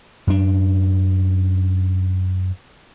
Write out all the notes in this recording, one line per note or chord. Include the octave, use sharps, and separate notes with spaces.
F#2 D4